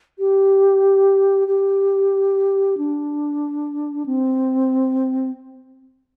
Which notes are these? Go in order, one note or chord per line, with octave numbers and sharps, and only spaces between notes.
G4
G4
D4
C4